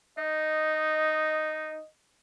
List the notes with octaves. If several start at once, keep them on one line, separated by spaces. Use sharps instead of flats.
D#4 D#5